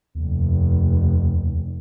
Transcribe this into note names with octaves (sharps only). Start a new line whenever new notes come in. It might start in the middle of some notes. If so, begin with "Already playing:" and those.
F1 D#2